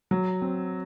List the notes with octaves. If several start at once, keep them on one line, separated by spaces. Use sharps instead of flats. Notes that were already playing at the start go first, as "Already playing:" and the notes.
F#3
C4